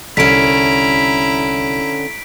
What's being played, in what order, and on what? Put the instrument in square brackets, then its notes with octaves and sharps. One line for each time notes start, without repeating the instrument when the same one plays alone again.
[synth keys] C2 [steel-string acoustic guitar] D3 C#4 [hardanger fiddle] E4 A#5 [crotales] B6 D7